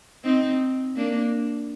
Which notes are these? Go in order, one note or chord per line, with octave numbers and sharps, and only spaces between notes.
C4 D#4
A#3 D4